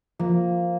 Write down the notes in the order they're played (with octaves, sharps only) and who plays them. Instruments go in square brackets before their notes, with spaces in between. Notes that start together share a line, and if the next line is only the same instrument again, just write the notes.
[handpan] F3 [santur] A#3